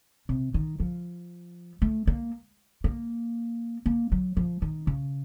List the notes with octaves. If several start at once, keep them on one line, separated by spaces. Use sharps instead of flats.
C3
D#3
F3
A3
A#3
A#3
A#3
F#3
F3
D#3
C#3